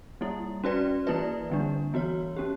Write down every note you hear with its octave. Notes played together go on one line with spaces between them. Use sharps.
G3 A#3 E4
C#4 F#4 B4 D5
E3 A#3 E4 B4 D5
D3 G3 A#3 D4
E3 B3 F#4 C#5
A#3 C#4 G4